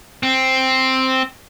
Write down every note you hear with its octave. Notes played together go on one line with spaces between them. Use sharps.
C4